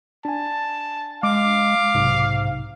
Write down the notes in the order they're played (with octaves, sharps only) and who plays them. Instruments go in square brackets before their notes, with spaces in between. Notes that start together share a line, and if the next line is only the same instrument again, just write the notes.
[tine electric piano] D4 G#5 [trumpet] A5
[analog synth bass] G#3 [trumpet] F5 [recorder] D6
[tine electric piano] B1 C3 [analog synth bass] G#2